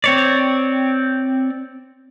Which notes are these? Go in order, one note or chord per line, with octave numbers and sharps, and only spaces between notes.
C4 C#5 D5